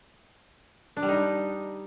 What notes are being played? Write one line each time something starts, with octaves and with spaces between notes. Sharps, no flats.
D4
G3
D#4